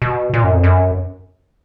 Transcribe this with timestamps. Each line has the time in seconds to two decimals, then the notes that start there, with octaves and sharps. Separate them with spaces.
0.02 B2
0.34 A#2
0.44 F#2
0.54 F2
0.64 F#2